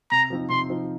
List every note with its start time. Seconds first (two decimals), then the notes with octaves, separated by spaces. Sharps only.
0.11 C3 A#5
0.30 F3 C4 D#4
0.50 C3 C6
0.69 F3 C4 D#4